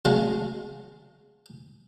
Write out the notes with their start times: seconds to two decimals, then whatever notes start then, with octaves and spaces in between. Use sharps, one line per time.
0.05 C#3 F#3 G#3 A3